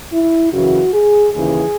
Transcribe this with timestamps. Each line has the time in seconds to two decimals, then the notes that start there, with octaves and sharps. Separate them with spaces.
0.12 E4
0.52 F#2 C#3 E3 F#4
0.93 G#4
1.34 D#2 C#3 E3 G#4